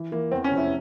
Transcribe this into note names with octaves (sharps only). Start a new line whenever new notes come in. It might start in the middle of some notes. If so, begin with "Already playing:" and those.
Already playing: E3
E3 A#3
E2 C4
C#4
F1
E4